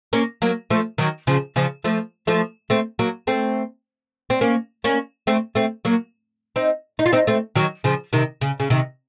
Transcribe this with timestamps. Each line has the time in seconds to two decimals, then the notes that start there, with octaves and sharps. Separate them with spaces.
0.13 A#3 C#4
0.42 F#3 A#3
0.70 F3 A3
0.98 D#3 F#3
1.27 C#3 F3
1.56 C#3 F3
1.84 F3 A3
2.27 F3 A3
2.70 A3 C4
2.99 F#3 A#3
3.27 A3 C4
4.30 C4
4.41 A#3 C#4
4.84 A#3 C#4
5.27 A3 C4
5.55 A3 C4
5.85 F#3 A#3
6.56 C4 D#4
6.99 D#4
7.06 F4
7.13 C4 D#4
7.27 A3 C4
7.55 D#3 F#3
7.84 C#3 F3
8.13 C3 D#3
8.41 C#3
8.60 C#3
8.70 C3 D#3